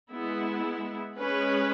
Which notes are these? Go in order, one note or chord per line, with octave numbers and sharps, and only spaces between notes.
G#3 B3 E4
G#3 C#4 G#4 B4